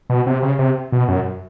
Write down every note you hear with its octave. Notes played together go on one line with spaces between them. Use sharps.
B2
C3
C#3
C3
B2
F#2